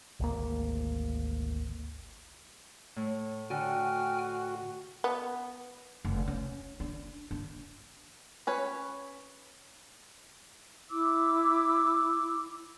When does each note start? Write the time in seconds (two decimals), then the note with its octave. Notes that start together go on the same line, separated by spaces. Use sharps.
0.20 G#1 D2 A#3
2.96 A2
3.50 D3 F#4 G5 G#5 F6
5.04 B3
6.05 F1
6.28 C#4
6.80 D4
7.31 D4
8.47 C#4 B4 C#5
10.91 E4 D6 E6